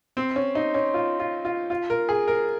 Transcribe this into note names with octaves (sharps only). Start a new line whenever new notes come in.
C4
C#4
D#4
C#4
F4
F4
F4
F4
A#4
G#4
A#4